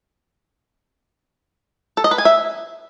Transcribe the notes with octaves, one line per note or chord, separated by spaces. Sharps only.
A4
D#5
B4
G#5
E5